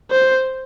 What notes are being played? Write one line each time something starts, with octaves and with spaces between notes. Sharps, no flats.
C5